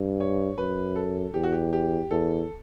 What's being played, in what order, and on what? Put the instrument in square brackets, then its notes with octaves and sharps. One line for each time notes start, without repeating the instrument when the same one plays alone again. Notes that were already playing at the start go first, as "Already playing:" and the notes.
Already playing: [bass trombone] G2
[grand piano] C#5
[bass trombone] F#2 [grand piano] B4
[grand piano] A4
[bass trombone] E2 [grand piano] G4
[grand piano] F#4
G4
G4
[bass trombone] E2 [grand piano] A4